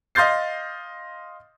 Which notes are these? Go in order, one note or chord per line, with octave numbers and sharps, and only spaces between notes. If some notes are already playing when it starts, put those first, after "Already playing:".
D#5 F5 C6 G6 A6 C7